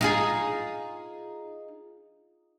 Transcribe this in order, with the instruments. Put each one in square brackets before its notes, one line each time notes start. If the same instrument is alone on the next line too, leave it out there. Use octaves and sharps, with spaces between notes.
[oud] D#4 F4 G#4